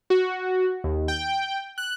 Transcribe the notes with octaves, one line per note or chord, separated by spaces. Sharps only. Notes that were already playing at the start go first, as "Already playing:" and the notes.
F#4
D#2
G5
F#6